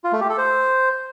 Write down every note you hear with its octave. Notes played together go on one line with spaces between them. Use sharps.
F4
A3
G4
A4
C5